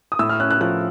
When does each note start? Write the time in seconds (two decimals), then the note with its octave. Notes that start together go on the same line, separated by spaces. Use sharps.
0.12 D#6
0.19 A2 E6
0.29 F6
0.40 C#4 F#6
0.51 F#6
0.61 F3 F#6